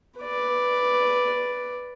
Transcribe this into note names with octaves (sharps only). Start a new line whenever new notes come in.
B4 D5